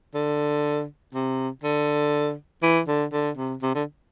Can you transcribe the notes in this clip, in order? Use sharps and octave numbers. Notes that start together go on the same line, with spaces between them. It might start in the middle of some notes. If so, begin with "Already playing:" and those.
D3
C3
D3
E3
D3
D3
C3
C3
D3